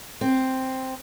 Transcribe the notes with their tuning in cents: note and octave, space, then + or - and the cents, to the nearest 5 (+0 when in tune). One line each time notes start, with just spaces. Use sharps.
C4 +0